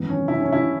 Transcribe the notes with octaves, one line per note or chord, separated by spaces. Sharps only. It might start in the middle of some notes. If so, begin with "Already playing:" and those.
Already playing: G#1 F#2 E3 B3
C#4
E4
C#4
E4